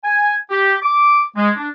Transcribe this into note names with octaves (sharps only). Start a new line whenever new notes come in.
G#5
G4
D6
G#3
D4